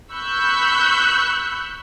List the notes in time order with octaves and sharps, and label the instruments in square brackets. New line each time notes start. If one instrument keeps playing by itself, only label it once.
[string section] B5 C#6 E6 F#6 G6